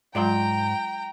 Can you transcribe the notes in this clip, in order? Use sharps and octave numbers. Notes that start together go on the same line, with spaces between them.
G#2 F#3 G#3 F4 D5 G5 A#5 C6